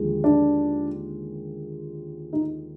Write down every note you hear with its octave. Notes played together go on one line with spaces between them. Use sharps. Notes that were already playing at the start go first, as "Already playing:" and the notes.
Already playing: D#2 D3 F3 G#3
D4
D#4